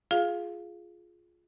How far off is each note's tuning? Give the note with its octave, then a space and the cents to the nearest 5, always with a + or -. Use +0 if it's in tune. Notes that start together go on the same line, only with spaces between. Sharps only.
F4 +0 G#4 +5 F5 +0